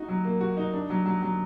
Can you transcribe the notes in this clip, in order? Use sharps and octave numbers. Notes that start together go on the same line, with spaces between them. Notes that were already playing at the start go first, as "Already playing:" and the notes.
Already playing: D#4 F#4
F#3
A#3
F#4
D#4
D4
F#3
F#3
F#3